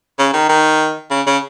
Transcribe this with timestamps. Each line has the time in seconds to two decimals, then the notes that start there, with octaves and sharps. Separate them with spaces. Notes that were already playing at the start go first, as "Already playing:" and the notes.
0.19 C#3
0.33 D#3
0.49 D#3
1.11 C#3
1.27 C#3